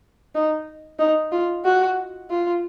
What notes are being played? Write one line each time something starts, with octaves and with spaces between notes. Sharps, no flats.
D#4
D#4
F4
F#4
F4